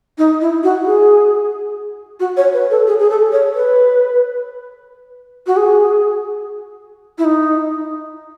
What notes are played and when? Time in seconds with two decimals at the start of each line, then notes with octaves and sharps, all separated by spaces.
0.18 D#4
0.41 E4
0.63 F#4
0.86 G#4
2.20 F#4
2.37 C#5
2.54 B4
2.71 A4
2.87 G#4
2.99 G#4
3.10 A4
3.32 C#5
3.55 B4
5.47 F#4
5.57 G#4
7.18 E4
7.25 D#4